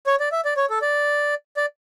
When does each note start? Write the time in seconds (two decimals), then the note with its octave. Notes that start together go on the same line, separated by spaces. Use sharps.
0.07 C#5
0.20 D5
0.32 E5
0.45 D5
0.57 C#5
0.70 A4
0.82 D5
1.57 D5